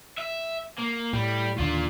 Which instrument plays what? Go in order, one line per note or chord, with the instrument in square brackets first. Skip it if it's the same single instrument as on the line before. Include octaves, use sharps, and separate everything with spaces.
[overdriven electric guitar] E5
A#3
[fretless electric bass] A2 [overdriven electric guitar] G3
[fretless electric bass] D#2 D3 [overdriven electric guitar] F4 D5